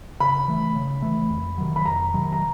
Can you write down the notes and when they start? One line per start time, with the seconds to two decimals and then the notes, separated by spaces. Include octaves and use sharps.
0.20 C#3 B5
0.48 E3 A3
0.75 C#3
1.02 E3 A3
1.30 F2
1.58 C3 D#3 F#3
1.76 B5
1.86 F2 A#5
2.14 C3 D#3 F#3
2.33 A#5